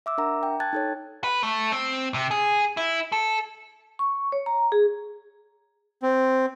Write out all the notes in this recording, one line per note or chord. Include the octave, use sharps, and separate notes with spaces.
E5 D6 E6
D4 A#4 E5 F#5 A#5
G5
G5 A5 F#6 G#6 A6
D#4 A4 C#5
B4
A3
C4
C3
G#4
E4
A4
C#6
C#5
A#5
G#4
C4